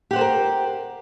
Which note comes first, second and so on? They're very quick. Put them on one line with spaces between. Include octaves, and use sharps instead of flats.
G4 F#5 C5 A4 A#4